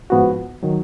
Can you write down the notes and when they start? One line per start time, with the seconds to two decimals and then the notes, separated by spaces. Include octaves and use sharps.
0.10 G#2 F3 B3 F#4
0.63 D#3 F#3